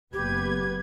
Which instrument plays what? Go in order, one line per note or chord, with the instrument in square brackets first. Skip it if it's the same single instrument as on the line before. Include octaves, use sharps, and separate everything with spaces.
[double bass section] F#1 [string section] B3 B4 G#6 [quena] G4